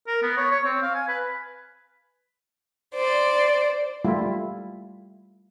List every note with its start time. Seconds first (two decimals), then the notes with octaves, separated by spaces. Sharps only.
0.07 A#4
0.22 B3
0.37 C#5
0.51 C#5
0.65 C4
0.82 F5
0.95 G#5
1.08 B4
2.94 C5 D5
4.05 G3 A3 E4 F4